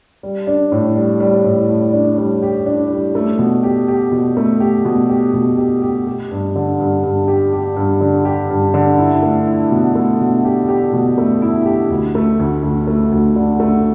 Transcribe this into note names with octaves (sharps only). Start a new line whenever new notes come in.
G3
D4
A2
G3
G3
A2
A2
D4
G3
G4
D4
G3
A3
B2
G4
G4
B2
A3
G4
B2
G4
B2
G4
G4
G4
G2
D3
G2
G2
G4
G4
G2
D3
G4
G2
D3
E4
A3
E4
B2
A3
B2
G4
G4
B2
A3
E4
G4
D2
A3
D2
D2
A3
D2
D3
A3